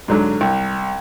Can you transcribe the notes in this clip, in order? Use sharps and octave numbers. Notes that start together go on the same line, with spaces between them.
G#2 D3 F#3
C2